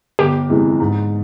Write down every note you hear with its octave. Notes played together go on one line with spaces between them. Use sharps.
G1 G4
F2 C3 E3 G#3
G#2